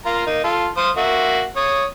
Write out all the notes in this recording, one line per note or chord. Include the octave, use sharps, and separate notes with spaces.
A#3 F4 A#5
A#3 D#4
F4 A4
C5 F5 D#6
A#3 F#4 E5
C#5 D#6